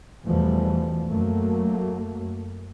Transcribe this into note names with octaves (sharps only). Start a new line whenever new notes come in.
E2 B2 E3 F3 G3 A3
F#2 F#3 A3 A#3